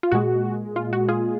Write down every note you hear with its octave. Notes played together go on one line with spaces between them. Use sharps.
F4
A#2 G#3 F#4
F4
F#4
F4 G#4